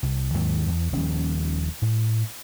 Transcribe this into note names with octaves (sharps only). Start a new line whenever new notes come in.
C2
D#2 G#2 D#3 F#3
E2
D#1 D#2 F3 C#4
A2